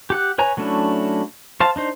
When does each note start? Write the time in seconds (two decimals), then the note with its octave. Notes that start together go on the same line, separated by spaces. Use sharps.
0.10 G4 F#5 F#6
0.38 B4 C#5 G#5 A#5
0.57 F#3 A3 C#4 D4 E4
1.60 C5 F5 A5
1.76 D4 D#4 C5